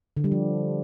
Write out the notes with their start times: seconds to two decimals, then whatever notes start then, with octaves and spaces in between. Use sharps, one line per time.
0.17 D3
0.24 G3
0.32 F3